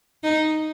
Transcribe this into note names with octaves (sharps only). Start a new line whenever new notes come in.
D#4